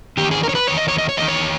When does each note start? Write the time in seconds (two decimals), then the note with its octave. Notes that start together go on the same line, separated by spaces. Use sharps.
0.17 E2 D#3 G4
0.31 G#4
0.43 A#4
0.49 C#5
0.55 B4
0.67 E2 D#3 C#5
0.77 D#5
0.88 C#5
0.98 D#5
1.09 C#5
1.17 E2 D#3 D#5
1.28 C#5